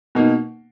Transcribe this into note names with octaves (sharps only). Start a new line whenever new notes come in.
B2 A#3 D#4